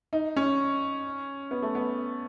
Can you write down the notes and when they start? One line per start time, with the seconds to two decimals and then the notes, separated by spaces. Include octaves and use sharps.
0.13 D#4
0.36 C#4
1.51 B3
1.62 A3
1.75 B3